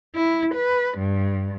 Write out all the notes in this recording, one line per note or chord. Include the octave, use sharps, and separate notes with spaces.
E4
B4
G2